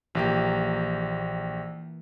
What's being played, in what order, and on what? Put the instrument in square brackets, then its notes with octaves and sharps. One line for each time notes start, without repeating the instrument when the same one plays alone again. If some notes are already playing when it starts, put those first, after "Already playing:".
[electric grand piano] A#1 G4 [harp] E3 A#3